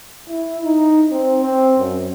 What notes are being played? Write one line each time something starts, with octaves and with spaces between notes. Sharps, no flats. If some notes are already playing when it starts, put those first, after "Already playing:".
E4
D#4
C4
C4
F#2